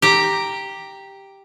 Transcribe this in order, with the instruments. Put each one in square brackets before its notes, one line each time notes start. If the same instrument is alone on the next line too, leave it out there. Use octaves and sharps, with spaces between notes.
[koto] G4 A#5